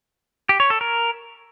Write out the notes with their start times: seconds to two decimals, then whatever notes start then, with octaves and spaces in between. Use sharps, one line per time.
0.49 G4
0.60 C#5
0.70 A4
0.81 A#4